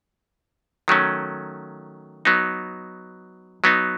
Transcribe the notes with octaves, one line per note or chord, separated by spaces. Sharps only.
D#3 F#3 A3 C#4
F#3 B3 D#4
F#3 B3 D#4